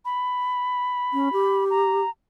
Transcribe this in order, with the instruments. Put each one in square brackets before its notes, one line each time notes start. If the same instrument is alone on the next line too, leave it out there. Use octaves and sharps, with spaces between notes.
[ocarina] B5
[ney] C#4
G4
[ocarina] A#5